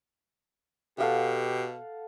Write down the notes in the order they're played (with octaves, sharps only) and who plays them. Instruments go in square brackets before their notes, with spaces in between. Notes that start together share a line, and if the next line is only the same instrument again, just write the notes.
[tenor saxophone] B2 [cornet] G4 [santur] A4 F5 F#5